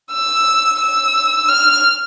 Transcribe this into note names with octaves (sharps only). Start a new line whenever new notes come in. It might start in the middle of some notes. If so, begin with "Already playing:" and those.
E6
E6
F6